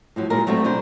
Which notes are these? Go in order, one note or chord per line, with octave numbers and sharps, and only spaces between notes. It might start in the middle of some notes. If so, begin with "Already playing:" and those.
A2 F3 F#3
A#2 F#3 G#3 A#4
F#3 G3 A3 C4 A#4 E5
B2 D4 A#4 C5